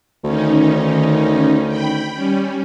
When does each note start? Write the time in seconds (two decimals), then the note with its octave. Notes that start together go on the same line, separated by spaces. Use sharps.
0.24 D2 D#3 C#4 D#4
1.67 G5 B5
2.15 G3 C#4